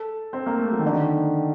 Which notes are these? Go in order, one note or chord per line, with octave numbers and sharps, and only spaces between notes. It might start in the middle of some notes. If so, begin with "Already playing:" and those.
Already playing: A4
C4
A#3
A3
F#3
D#3
D3
D#3